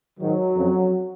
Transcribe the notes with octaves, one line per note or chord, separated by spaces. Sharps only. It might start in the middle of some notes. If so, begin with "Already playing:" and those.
G#2 D#3 F#3
F2 C#3